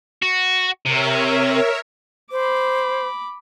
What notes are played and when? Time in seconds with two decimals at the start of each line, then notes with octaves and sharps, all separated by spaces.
0.22 F#4
0.86 C3 A#4 C#5 E5
2.32 C5 B5 D6